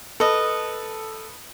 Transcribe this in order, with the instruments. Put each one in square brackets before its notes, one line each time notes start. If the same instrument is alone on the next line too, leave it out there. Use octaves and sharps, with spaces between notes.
[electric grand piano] A4 [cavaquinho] B4 D#5